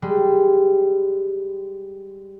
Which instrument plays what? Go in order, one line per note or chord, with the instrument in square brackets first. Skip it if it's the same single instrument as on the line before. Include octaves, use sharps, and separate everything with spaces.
[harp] G3 G#3